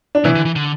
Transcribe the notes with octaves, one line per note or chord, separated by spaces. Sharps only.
D4
B2 E3 E4
D3
E3
D3